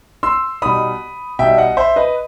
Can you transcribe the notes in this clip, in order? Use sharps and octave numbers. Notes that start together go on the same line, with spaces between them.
C6 E6
B2 G3 D#4 B5 D#6
B2 G3 D#4 E5 G5
D#5 F#5
C5 E5
B4 D#5